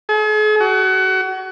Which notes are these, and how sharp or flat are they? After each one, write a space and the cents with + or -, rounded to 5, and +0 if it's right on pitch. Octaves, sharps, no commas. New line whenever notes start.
G#4 +45
F#4 +25